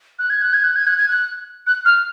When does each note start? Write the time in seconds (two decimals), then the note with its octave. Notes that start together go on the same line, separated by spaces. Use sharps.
0.19 F#6
0.30 G#6
0.41 F#6
0.53 G#6
0.63 F#6
0.76 G#6
0.87 F#6
0.97 G#6
1.08 F#6
1.66 F#6
1.85 F6